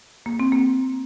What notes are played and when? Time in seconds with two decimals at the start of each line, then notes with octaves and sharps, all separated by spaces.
0.26 A#3
0.40 C4
0.52 A#3